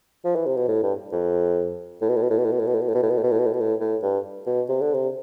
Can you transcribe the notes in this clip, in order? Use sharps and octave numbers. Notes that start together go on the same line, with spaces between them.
F3
E3
C3
B2
A2
G2
F2
A2
B2
A2
B2
A2
B2
A2
B2
A2
B2
A2
B2
A2
B2
A2
B2
A2
B2
A2
B2
A2
B2
A2
A2
G2
B2
C3
D3
C3